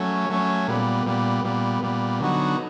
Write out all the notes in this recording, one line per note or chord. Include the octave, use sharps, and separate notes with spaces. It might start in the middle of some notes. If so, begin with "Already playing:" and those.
Already playing: F#3 A3 C#4
F#3 A3 C#4
A#2 G3 B3
A#2 G3 B3
A#2 G3 B3
A#2 G3 B3
D3 F#3 B3 D#4 F#4